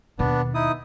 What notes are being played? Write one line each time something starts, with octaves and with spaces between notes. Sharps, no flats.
D#2 B2 B3 D4
D#4 E4 D#6